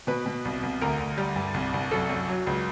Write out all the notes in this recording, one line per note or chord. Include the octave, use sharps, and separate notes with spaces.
B2 B4
B2
C2
C2
D2 A#4
D2
G3
G2
C2
C2
F#2 A4
F#2
F#3
C#2